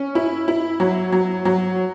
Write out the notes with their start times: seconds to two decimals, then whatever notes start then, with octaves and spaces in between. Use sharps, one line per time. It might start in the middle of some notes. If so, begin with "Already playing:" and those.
Already playing: C#4
0.15 E4
0.48 E4
0.80 F#3
1.12 F#3
1.45 F#3